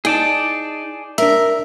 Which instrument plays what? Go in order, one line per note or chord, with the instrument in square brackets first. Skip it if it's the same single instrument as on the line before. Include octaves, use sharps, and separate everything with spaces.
[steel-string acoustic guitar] D#4 [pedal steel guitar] G#4 D5 A5
[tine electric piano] D4 E5 [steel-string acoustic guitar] A#4